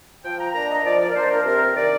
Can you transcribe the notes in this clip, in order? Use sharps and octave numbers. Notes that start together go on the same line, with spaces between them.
F3 G5
A#5
A#3 D4 A#5
D#5
F3 D5
D5
A#4
A#3 D4 C5
A#4
C3 A#4
D#3 A3 D5